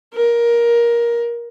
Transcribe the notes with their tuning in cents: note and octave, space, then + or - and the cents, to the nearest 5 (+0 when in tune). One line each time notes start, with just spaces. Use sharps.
A#4 +15